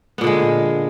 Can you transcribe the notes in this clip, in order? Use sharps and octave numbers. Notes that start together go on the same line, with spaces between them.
A#2 D3 G#3 B3